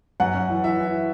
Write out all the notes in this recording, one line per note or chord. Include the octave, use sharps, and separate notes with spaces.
F#2 F#5
F#2
E3
E3 E5
E3